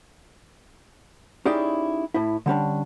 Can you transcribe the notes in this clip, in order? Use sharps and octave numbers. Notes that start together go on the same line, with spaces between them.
C#4 D#4 E4 G4 G#4 D5
A2 E4
D3 G3 C#4 D4